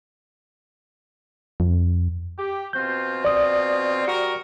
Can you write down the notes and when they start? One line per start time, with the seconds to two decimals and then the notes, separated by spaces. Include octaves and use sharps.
1.60 F2
2.38 G4
2.73 B2 C4 F4 G6
3.25 D5 D#6
4.05 G3 F#4 A#4